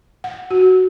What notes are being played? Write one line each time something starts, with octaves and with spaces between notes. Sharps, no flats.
F#5
F#4